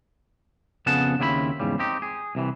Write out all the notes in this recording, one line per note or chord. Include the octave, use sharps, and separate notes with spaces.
F2 C#3 B3 G#4 F#5 A5
D#2 C#3 C4 E4 A4 B5
E2 G#2 C#3 G3
C4 D#4 G4
G#4
C2 C3 E3